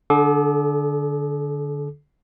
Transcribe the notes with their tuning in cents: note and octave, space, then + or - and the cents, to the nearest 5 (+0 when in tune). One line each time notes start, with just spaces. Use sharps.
D3 +0 A4 -40 D6 +25